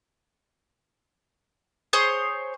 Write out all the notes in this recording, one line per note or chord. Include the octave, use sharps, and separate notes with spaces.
G#4 C5 C#5 D#6